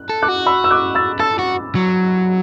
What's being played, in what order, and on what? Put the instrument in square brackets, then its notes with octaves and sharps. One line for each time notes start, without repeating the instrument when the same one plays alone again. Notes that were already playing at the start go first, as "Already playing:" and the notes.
Already playing: [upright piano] F#6
[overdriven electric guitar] A4
[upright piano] D6 F#6
[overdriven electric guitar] F#4
[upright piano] B5 E6
E6
D6 F#6
E6 A6
[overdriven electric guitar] A4 [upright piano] E6 A6
[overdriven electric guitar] F#4
F#3